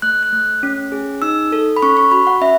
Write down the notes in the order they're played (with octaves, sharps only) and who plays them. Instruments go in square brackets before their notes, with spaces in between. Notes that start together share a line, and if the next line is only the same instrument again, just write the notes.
[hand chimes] A3 F#6
F#6
A3
C#4
G#4
D#4 E6
A4
B5
C#4 C#6
C#6
F#4 B5
F#5
C#4 E5